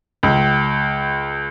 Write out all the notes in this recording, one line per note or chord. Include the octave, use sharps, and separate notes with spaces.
C#2